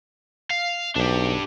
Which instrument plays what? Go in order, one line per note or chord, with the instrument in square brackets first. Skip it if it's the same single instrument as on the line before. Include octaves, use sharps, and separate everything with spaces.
[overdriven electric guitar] F5
[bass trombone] B1 [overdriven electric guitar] D4 G4